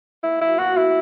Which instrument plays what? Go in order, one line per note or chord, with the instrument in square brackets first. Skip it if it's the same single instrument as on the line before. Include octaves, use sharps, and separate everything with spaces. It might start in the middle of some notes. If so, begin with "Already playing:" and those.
[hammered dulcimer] A#3 [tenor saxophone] E4
[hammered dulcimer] F#3 [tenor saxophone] E4
[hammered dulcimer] B2 [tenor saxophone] F#4
[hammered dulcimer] B2 [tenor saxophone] E4